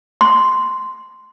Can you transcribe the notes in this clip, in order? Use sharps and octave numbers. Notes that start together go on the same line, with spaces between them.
C6